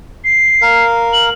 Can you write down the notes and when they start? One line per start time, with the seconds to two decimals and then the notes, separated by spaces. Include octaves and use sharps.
0.24 C7
0.62 A#4 F5
1.13 F#7